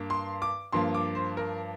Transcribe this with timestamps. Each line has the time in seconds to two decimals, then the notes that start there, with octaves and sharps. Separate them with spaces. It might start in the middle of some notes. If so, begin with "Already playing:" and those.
Already playing: G2 A#3
0.10 C6
0.42 D6
0.72 G2 F3 A#3 C6
0.94 D6
1.15 C5
1.37 A#4